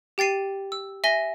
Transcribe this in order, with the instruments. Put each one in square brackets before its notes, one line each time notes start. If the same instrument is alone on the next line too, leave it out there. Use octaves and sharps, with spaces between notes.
[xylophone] G4 G5 A6 C7 D#7
E6
E5 G#5 A#6 G7